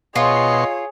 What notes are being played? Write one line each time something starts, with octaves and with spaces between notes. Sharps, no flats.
B2 F4 G#4 C#5 D#5 C6 C#6